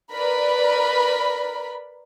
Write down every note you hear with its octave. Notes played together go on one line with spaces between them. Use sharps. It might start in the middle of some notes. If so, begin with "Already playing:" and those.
A#4 B4 D5 B5